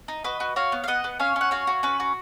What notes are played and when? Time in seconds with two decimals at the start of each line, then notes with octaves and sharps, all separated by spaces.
0.08 D#4
0.24 F#4 B4 D#5
0.40 F#4
0.56 F#4 C#5 F5
0.72 B3
0.84 F5
0.88 B3 D#5 F#5
1.04 B3
1.19 C#4 C#5 F5
1.36 C#4 F#5
1.51 F#4 C#5 F5
1.67 F#4
1.83 C#4 B4
2.00 F#4